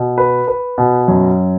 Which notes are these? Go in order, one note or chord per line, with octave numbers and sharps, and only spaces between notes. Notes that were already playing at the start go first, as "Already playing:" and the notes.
Already playing: B2
B4
B4
B2
F#2